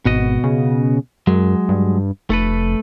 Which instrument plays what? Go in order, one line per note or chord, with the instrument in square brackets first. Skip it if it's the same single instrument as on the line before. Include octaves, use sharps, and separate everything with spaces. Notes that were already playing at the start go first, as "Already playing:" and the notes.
[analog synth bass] G#1 [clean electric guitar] B2 F#4 D#5
[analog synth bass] C#3
[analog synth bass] F#2 [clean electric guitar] F#3 G#3
[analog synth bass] G2
[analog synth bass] F1 [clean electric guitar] A3 A4 B4